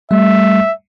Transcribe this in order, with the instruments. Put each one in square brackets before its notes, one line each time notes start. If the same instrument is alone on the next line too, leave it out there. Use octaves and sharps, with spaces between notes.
[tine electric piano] G3 A3 [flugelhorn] E5